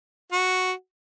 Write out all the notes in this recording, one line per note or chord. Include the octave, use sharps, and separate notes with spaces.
F#4